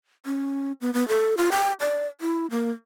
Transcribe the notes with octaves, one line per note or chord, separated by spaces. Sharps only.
C#4
B3
B3
A4
F4
G5
D5
E4
A#3